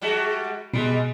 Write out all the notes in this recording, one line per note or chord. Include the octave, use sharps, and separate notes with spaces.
G3 G#3 F#4
B2 G3 G#3